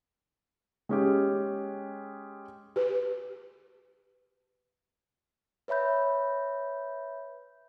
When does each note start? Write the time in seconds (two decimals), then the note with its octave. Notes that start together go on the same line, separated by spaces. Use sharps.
0.89 G#3 C#4 G4
2.76 G4 B4
5.68 B4 C#5 E5 B5 G6